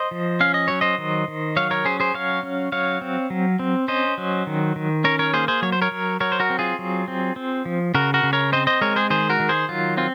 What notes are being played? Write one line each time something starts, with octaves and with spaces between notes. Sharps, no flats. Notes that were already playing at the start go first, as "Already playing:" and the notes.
Already playing: C5 D#5
F3
C#4 F5
D#5
F#3 C#5
C5 D#5
D#3
D#3
F#3 C#5 F5
A#4 C#5
C#4 G#4 C5
G#4 C5
F#3 C#5 F5
C#4
F#3 C#5 F5
C4
F#3
C4
C#4 C5 D#5
F#3
D#3
D#3
C#4 A#4 C#5
A#4 C#5
A#3 G#4 C5
G#4 C5
F#3 C#5
C5
A#4 C#5
F#3
F#3 A#4 C#5
C5
F#4 A#4
C4
F4 G#4
F#3
C4
C4
F3
C#3 F#4 A#4
F#4 A#4
C#3
A#4 C#5
C4 C5 D#5
C5 D#5
G#3 A#4 C#5
G#4 C5
D#3 G#4 C5
F#4 A#4
D#3
G#4 C5
F#3 F4
C4 F4